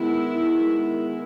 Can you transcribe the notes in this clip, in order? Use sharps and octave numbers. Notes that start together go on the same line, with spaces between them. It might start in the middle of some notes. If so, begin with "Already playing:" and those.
Already playing: D#3 G#3 B3 E4